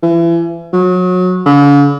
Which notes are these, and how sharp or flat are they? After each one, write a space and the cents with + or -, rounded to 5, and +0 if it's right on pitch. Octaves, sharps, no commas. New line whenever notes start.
E3 +35
F#3 -25
D3 -45